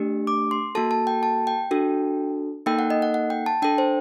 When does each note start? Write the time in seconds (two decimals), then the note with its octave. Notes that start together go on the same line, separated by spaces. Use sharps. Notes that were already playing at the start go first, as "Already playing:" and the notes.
Already playing: A3 D4 G4
0.27 D6
0.51 C6
0.75 A#3 F#4 A4 A5
0.91 A5
1.07 G5
1.23 A5
1.47 G5
1.71 D4 F#4 A4
2.66 A#3 D#4 A4 G5
2.79 F#5
2.90 D#5
3.02 F#5
3.14 F#5
3.30 G5
3.46 A5
3.62 D4 A4 G5
3.78 C5